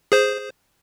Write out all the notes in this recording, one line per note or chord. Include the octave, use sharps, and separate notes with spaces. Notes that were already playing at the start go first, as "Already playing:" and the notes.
G#4 C5